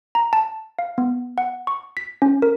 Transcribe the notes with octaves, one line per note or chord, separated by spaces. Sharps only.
A#5
A5
F5
B3
F#5
C#6
B6
C#4
A#4